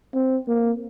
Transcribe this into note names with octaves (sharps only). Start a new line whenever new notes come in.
C4
A#3